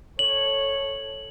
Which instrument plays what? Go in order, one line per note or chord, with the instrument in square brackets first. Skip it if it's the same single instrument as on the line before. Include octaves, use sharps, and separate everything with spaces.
[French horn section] A4 C#5 [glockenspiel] F#7